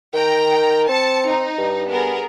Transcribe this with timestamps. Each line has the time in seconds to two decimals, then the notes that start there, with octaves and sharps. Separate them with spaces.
0.14 D#3 G5 A#5
0.89 C4 A5 C#7
1.27 D#4
1.58 G2
1.89 B3 G#4 A#4